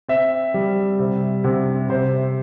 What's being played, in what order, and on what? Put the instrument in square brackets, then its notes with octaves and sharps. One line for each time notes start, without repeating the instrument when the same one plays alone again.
[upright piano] C4 E5
G3
C3
C3
C3 C5